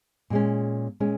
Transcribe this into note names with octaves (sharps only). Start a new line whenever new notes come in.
A#2 G#3 C#4
A#2 G#3 C#4